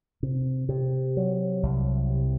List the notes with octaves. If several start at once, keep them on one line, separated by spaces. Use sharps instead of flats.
C3
C3
F#3
C2
C3